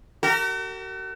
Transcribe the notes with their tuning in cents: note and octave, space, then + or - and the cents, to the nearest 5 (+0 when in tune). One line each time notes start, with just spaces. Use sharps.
F#4 +45 A#4 -35